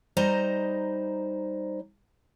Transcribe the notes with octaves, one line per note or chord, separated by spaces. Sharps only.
G3 D#4 C5 D#5 A#5